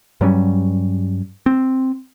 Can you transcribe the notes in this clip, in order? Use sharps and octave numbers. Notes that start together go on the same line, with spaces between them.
G2 F#3 G3 C#4
C4